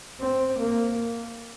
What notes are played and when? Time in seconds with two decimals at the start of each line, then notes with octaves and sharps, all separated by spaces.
0.20 C4
0.59 A#3